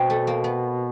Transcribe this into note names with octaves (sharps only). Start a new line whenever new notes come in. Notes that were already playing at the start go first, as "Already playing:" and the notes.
Already playing: B2 C4
A3
A#3
B3